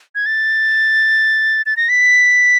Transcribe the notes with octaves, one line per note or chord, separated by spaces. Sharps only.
G#6
A6
A6
A#6
B6